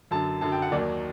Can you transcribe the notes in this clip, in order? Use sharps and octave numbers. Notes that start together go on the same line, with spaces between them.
F#2 D3 F#3 A5
F#2 D3 F#3 A5
G5
F#5
D#2 D#3 F#3 D5